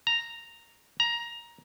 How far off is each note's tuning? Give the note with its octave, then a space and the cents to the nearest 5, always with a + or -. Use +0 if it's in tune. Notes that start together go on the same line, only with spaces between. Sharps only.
A#5 -5
A#5 +15